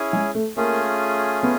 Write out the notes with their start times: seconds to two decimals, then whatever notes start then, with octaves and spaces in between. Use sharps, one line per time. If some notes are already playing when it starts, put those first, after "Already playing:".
Already playing: C#4 E4 G#4 C#5
0.13 G#3
0.35 A3
0.56 A3 A#3 C#4 F4 G#4
1.43 B3